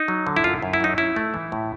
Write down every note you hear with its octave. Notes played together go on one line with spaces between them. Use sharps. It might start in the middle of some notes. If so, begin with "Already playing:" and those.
Already playing: D#4
F#3
D3
E4
F#2 F4
F#2
E4
F#3 D#4
C#4 E4
A3
E3
A2